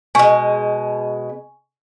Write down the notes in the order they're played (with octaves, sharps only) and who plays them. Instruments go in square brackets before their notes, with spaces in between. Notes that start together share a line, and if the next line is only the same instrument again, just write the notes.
[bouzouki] B2 G#3 [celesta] G#5 C#6